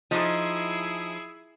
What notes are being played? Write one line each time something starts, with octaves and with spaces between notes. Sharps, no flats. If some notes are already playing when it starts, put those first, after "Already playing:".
F3 D#4 E4 G#4